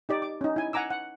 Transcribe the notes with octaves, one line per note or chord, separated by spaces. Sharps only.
D#4 G4 D5
D6
C#4 D#4
E4 G#5
F#5 G#5 A#5 D6 E6
F#5